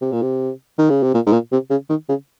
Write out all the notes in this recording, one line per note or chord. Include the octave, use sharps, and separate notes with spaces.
C3
A#2
C3
D#3
C#3
C3
A#2
G#2
A#2
C3
C#3
D#3
C#3